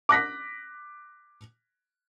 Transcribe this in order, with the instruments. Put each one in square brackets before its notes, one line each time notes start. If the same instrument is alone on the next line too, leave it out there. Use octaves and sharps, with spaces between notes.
[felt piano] D6 F#6 A#6 B6